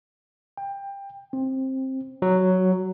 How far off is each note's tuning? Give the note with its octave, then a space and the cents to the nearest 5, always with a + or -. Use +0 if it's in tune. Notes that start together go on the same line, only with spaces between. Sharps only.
G5 +20
C4 +15
F#3 +5